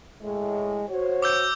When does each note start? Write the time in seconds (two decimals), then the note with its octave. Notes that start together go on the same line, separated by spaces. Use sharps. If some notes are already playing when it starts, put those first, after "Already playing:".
0.22 A2 G#3
0.88 F#4 C5 C#5
1.22 D6 E6 G6